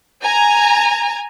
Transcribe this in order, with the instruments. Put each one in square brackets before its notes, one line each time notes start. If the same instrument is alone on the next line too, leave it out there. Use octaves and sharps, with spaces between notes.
[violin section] G#5 A#5